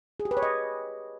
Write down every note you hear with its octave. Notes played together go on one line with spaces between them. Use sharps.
G#4
G4
B4
C#5
D#5